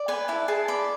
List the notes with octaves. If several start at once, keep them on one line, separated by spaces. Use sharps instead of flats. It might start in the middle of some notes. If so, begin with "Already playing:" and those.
Already playing: D5
B4 G#5
E4 A5
G#4 A5
D5 B5